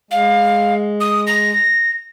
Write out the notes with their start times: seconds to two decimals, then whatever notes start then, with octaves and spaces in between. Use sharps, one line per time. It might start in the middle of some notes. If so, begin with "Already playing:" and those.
0.11 G#3 F5
1.00 D#6
1.27 A#6